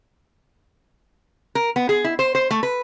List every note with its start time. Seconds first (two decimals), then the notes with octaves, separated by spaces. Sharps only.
1.55 A#4
1.76 B3
1.89 G#4
2.04 E4
2.19 C5
2.35 C5
2.51 A3
2.63 B4